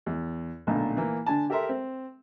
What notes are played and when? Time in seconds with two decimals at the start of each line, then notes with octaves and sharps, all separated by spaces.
0.06 E2
0.67 B1 A#2 D3 A3
0.97 E3 A#3
1.26 D3 D4 G#5 A5
1.50 G4 A4 A#4 E5 A#5 C6
1.69 C4